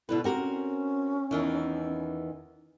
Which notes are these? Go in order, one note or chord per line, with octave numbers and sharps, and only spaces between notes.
B2 D3 E4 B4
C4 F#4 G4 A#4
C#4
E2 D#3 E3